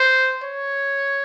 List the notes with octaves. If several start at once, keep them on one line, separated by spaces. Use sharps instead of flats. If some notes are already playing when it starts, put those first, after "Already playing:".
Already playing: C5
C#5